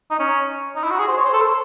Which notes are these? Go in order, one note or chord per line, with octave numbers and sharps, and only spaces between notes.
D#4
C#4
D#4
E4
F#4
G#4
C5
C#5
C5
A4
C5